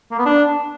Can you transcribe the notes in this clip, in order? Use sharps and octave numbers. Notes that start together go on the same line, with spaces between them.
A#3
B3
D4